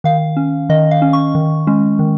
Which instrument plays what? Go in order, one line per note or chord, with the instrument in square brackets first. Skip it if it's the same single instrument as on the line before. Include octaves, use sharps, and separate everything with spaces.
[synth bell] D#3 F5
C#4
D#3 D#5
F5
C#4
C#6
D#3
G#3 C#4
D#3